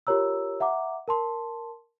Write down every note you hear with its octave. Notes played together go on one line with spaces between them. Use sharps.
F4 G4 A#4 C#5 A#5 E6
E5 F#5 A#5 D6
A#4 A5 C6